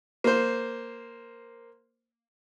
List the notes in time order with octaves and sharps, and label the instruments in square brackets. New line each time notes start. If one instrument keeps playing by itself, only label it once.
[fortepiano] A#3 C5